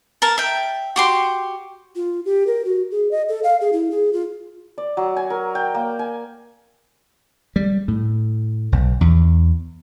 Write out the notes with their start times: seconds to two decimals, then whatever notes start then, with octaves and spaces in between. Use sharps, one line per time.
0.22 A#4 A5
0.38 E5 G5
0.96 F#4 G4 C6
1.96 F4
2.25 G4
2.47 A#4
2.65 F#4
2.91 G#4
3.11 D#5
3.29 A4
3.44 F5
3.61 G#4
3.73 E4
3.91 G#4
4.13 F4
4.78 D5
4.97 F#3
5.16 G#5
5.30 A#4
5.55 G5
5.74 A#3
5.99 G#5
7.56 G3
7.88 A2
8.72 B1
9.01 E2